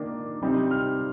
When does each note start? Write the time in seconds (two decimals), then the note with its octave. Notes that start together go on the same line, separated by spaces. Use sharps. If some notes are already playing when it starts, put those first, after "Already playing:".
Already playing: D#3 A#3 D4
0.41 C3 G3 C4 D#4
0.71 F6